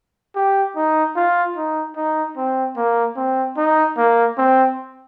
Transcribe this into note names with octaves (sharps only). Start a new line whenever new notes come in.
G4
D#4
F4
D#4
D#4
C4
A#3
C4
D#4
A#3
C4